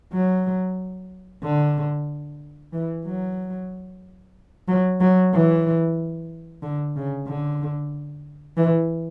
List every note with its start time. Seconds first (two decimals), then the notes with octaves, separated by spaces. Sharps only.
0.13 F#3
1.43 D3
2.73 E3
3.05 F#3
4.68 F#3
5.00 F#3
5.33 E3
6.63 D3
6.96 C#3
7.28 D3
8.57 E3